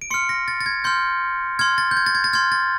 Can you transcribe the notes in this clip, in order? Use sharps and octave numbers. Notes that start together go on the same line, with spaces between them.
D7
C6 F6 C#7
A#6
A6
A6
G#6
C6 F6 G6
C6 F6 G#6
A6
G6
G#6
A6
G#6
A6
C6 F6 G#6
A6